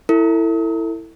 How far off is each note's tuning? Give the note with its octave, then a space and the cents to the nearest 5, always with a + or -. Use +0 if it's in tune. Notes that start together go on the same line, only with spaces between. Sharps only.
E4 +0 A4 +35